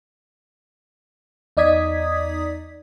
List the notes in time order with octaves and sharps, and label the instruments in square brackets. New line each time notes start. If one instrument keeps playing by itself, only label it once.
[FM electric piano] E2 D#4 D5 D#6 G#6 B6